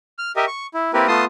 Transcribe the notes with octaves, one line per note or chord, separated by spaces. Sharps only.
F6
G4 A#4 D#5 E5
C#6
E4
A#3 C4 E4 G4 A#4 B4
A3 B3 F4 A5 C6 D#6